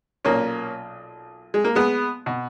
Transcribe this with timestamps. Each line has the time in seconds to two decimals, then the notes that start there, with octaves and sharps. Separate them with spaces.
0.25 B1 A#2 A#3 C#4
1.54 G#3
1.64 A#3
1.75 G#3 B3
2.26 B2